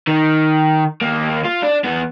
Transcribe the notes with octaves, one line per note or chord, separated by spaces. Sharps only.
D#3
D#2 A#3
F4
D4
E2 B3